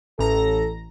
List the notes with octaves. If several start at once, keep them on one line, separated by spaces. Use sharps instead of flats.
A1 A4 A#5 A#6